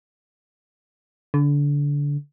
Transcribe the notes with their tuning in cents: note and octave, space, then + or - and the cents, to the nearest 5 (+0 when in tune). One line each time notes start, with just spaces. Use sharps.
D3 -25